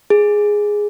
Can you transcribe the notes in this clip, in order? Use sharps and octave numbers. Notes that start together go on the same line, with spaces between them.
G#4